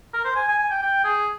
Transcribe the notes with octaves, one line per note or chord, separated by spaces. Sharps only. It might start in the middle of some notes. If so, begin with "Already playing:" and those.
A#4
C5
G#5
G#5
G#5
G5
G5
G#4